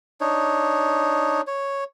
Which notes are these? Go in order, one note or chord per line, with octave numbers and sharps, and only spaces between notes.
D4 D#4 C#5
C#5